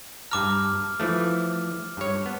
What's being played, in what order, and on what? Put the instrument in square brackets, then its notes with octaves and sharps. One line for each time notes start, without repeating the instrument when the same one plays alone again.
[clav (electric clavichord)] G2 A5 A#5 [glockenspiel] D6 F6
[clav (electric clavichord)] E3 F3 A3
G2 C#5
B3